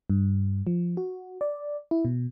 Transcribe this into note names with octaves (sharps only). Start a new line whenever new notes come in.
G2
F3
F#4
D5
E4
B2